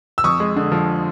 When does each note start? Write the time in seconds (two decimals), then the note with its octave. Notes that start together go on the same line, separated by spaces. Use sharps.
0.18 E6
0.24 F2 C#6 D#6
0.40 G#3
0.56 D3
0.72 F3